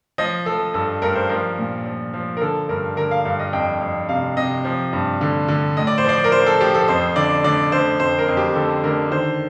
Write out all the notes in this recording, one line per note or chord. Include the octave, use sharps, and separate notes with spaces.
F3 D#5
F3 A4
G2 A4
G2 A#4
C5
F3 A#4
A#2
F3
F3
A#4
D3 A4
G2 A#4
D3 A#4
F5
G2 F5
D#5
F2 G5
F2
C3 F5
C3 D#5
F3
G2
D3
D3
A2 D#5
D5
C5
F3 D5
A#4
F3 C5
A4
F3 G4
A4
F2 C5
D3 D5
D3 D5
D3 C5
F2 C5
A#4
F2
G4
D3 A4
D3 A#4
D#3 C5